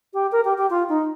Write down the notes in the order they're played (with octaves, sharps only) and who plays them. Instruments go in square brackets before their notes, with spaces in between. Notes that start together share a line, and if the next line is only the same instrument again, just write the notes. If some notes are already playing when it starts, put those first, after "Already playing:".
[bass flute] G4
A#4
G4
G4
F4
D#4